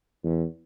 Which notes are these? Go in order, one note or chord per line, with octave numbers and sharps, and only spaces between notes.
E2